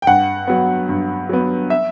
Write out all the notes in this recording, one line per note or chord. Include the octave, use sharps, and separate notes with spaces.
G5
G2 F#5
F#3 B3
G2
F#3 B3
E5